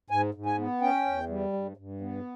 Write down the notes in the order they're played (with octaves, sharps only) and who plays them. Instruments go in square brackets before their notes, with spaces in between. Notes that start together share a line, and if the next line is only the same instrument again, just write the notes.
[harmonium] G#2 G#5
G#2
G#5
B3
C#4 G5
E2
G3
G2
G2
B3